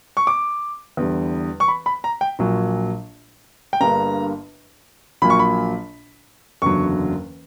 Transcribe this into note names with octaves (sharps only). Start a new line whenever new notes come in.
C#6
D6
E2 D3 G3
C#6
B5
B5
A#5
G5
A#1 A#2 F#3
G5
G1 G2 D3 A#3 A#5
A#1 A#2 F#3 A#3 B5
C#6
B5
F#1 E2 D3 F#3 C#6